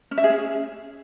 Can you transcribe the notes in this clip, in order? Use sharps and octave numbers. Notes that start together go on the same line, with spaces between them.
C#4
E5
G#4
C#4